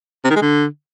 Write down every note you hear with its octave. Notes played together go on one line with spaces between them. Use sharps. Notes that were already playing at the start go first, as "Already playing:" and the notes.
C3
D#3
G#3
D3